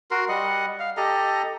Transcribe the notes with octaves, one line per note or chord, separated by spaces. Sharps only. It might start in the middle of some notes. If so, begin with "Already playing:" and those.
F#4 A#4 C6
G3 D#5 F#5
F5
G4 A4 D#5 A#5